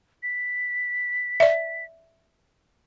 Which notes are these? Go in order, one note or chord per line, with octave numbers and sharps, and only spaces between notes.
B6
D5 E5